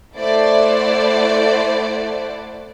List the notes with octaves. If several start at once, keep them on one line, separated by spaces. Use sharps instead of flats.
A3 E4 C5 D5 F#5